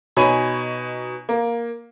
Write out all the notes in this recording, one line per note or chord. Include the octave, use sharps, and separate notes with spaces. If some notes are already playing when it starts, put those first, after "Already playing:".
B2 D#4 C#5 G#5 B5
A#3